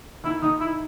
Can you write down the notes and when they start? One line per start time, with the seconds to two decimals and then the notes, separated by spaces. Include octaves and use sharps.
0.24 D#3 E4
0.42 D#3 D#4
0.60 E4